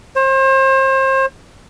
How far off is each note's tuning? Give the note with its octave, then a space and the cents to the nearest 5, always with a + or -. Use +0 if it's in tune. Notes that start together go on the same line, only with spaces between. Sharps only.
C5 +35